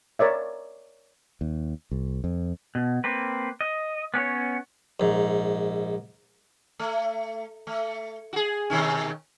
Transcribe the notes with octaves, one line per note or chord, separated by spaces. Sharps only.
A#4 C#5 D5 E5
D#2
C2
F2
B2
A#3 C4 B4
D#5
B3 C#4 G4 C#5
A#1 G#2
A3
A3
F#4 G#4
B2 D#3 C#4